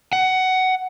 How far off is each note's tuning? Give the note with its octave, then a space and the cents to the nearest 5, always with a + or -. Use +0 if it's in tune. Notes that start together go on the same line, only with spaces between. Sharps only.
F#5 +15